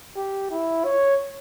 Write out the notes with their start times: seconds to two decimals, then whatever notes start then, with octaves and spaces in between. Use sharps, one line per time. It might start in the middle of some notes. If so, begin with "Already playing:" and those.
0.16 G4
0.51 E4
0.85 C#5